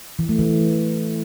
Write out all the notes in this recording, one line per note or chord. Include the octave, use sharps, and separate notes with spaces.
E3
A3
E3